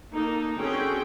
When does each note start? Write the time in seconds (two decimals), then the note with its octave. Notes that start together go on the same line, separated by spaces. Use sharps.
0.11 A#3 D#4 A4
0.57 D3 C4 C#4 F#4 G#4 G5